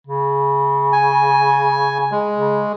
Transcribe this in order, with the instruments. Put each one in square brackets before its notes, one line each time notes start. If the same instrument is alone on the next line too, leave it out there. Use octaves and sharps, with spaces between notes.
[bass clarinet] C#3
[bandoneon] G#5
G#3
[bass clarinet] C#3